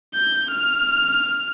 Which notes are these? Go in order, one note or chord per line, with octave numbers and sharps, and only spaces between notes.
G6
F6